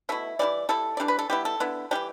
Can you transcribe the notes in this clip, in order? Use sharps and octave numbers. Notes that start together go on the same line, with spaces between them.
B2 A3 E4 E5
E3 G3 E4 D5
G3 E4 A4
E3 G3 D4 D5
B4
A4
G3 B3 E4 G4
A4
D3 B3 E4
E3 G3 D4 G4